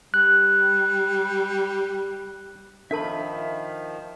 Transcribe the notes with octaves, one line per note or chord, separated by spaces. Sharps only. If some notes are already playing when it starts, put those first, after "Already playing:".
G3 F#6
D#3 F3 D4 A#4 E5 A5 B5